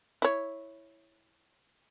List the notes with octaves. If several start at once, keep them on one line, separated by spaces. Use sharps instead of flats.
E4 C#5